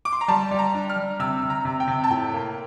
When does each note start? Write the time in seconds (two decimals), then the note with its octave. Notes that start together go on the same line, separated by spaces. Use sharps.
0.05 D6
0.13 C6
0.21 A#5
0.28 G3 A5
0.51 G3
0.59 A#5
0.74 D4
0.90 F6
0.96 G3
1.19 C3 E6
1.43 C3
1.50 A#5
1.65 C3
1.80 G5
1.88 C3
2.04 A5
2.10 A2 G5
2.34 A#3